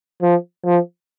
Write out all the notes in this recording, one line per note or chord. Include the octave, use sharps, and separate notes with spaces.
F3
F3